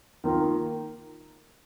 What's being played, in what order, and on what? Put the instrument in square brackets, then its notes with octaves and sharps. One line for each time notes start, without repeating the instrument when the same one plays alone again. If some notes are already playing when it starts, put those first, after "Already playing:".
[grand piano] D#3 A#3 F4 A#4